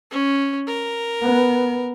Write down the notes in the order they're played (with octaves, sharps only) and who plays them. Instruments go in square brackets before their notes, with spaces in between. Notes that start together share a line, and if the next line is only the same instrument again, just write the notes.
[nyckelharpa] C#4
A#4
[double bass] B3